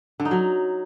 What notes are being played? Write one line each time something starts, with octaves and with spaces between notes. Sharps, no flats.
D3
D#4
F#3